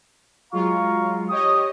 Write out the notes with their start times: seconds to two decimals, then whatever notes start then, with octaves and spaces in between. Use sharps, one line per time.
0.53 F#3 G#3 F4 F5 A#5 C#6
1.30 G4 C#5 D#5 C#6 D#6